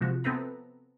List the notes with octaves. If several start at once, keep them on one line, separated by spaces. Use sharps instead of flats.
C3 F3 G#3 F#4
B3 C4 A4 B4 E5 A#5